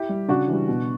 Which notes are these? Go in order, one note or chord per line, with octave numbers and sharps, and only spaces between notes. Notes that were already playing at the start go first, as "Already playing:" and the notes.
Already playing: E4 G4
G3
C#3 D4 F#4
E3 G3
B2